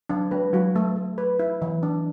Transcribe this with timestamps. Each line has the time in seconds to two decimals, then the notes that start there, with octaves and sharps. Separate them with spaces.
0.09 F#3 D4
0.31 G#3 B4
0.53 F#3 F#4
0.76 A3
0.96 A3
1.18 B4
1.39 E4
1.62 E3
1.83 D4